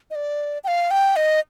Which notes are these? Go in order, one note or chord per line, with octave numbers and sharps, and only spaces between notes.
D#5
D5
G5
F5
G5
D#5